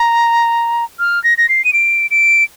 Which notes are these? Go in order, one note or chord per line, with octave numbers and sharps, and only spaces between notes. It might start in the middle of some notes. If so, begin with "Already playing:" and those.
Already playing: A#5
F6
A#6
A#6
C7
D#7
D7
D7